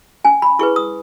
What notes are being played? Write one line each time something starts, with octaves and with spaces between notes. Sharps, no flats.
C#4 G#5
B5
E4 G#4 B4 C#6
D#6